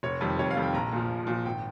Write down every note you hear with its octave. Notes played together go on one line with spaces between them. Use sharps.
F1 C#5
F2 D#3 G3
F1 C#5
F5
F2 D#3 G3
G5
A#1 A#5
A#2 F3
A#1
A#2 F3
G#1 G5